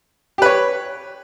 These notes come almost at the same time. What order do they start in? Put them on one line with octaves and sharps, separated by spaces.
G4 B4 C#5